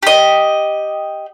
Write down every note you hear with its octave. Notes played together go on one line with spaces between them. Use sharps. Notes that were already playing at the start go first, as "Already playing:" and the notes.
G4 D#5